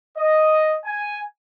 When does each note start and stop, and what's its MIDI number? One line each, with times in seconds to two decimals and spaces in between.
0.17 0.75 75
0.85 1.21 80